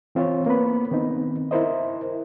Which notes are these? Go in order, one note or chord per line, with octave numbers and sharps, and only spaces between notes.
E3 C4 F4 C5 C#5
A#3 B3 B4 B5
D#3 B3 C4 D#4
E4 A#4 C5 D#5